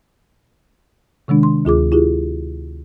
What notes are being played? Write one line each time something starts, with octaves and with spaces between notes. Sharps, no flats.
C3 D#3 G#3 D4
C6
D2 F4 G#4 D6
E4 F4 G4 G#4